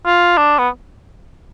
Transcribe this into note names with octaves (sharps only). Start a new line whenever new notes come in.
F4
D4
B3